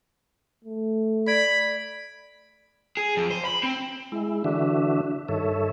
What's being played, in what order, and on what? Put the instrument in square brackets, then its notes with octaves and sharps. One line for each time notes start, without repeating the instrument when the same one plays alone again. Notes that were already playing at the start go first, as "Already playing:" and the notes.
[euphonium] A3
[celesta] D5 G#6 D7 [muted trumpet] B5
[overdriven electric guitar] G#4
F2
C5
B5
C4
[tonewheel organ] G#3 E4
D3 E3 D4 F#4 E5
G2 D#3 A4 C#5 E5